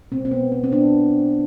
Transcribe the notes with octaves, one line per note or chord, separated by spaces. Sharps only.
B2 G#3 C4
C4
B3
C4
C4
B3 D4